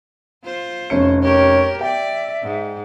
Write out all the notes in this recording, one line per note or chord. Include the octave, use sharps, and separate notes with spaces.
F4 C5
F1 C#4 C#5 C#7
G4 A#4 C#5
D5 E5 G5
G#2